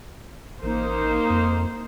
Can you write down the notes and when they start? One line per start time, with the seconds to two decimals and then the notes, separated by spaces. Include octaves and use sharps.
0.63 A1 A#3 D#4 C5
1.30 F2